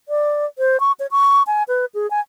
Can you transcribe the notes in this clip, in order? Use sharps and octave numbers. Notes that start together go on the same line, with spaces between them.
D5
C5
C#6
C#5
C#6
G#5
B4
G#4
G#5